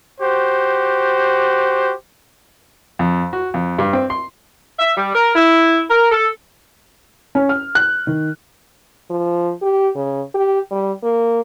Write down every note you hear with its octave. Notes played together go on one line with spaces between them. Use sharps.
F#4 G4 C5
F2
F#4
F2
G2
C4
C6
E5
G3
A#4
E4
A#4
A4
C#4
F6
F#6
D#3
F3
G4
C#3
G4
G3
A#3